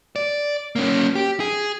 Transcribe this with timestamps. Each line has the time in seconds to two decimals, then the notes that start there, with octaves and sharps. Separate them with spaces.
0.16 D5
0.76 A#3 C#4
1.15 G4
1.40 G#4